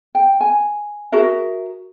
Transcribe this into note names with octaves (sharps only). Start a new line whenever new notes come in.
G5
G#5
F#4 G#4 A#4 E5